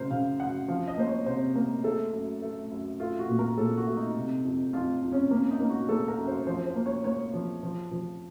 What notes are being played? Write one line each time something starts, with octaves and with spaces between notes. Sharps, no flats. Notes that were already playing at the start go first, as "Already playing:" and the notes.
Already playing: F#2 C#3 A#4 C5
C#3 F5
F#2 F#5
F3 F5
D#5
A#3 C5
C#5
C3 C5
A#3 A#4
A3 A4
F#2
A3
F#2
A3 F4
F#4
A#2
A#4
A#2 A4
F#4
A3
D#4
C3
F2
F2 F4
F2
C#4
A#3 C#4
D#4
A#3
F#4
A#3 A4
A#4
F#2
C5
F3 C5
C5
A#3
C#5
A#3 C#5
F3
F3
F3